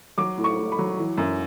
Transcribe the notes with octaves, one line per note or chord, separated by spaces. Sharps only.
F#3 D6
A2
C#6
A2
B5
F#3
E3
F#2